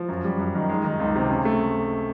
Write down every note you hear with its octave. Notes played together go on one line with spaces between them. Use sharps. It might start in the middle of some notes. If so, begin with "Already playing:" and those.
Already playing: F3
F#2
G3
F#2
D#3
G#3
D#3
C#2
C3
C#3
A3